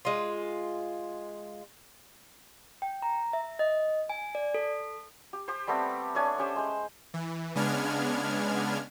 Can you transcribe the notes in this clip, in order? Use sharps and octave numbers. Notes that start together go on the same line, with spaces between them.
G#3 F4
G5
A#5
E5
D#5
G#5
D5
A4
G4
G4 C5
G3 A3 B3 C4
A3 D4 C#5 G#5
C#4 G4 C5
G#3 C5
E3
C#3 G#3 B3 D4 F6 G#6